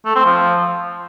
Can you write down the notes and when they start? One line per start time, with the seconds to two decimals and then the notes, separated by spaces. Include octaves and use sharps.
0.05 A3
0.15 C4
0.26 F3